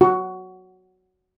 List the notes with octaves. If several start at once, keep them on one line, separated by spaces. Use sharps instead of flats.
F#4